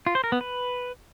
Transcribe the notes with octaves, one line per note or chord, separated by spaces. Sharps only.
F4
C5
A#4
B3
B4